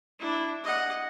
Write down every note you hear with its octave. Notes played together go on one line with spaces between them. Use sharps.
D4 E4
D#5 F#5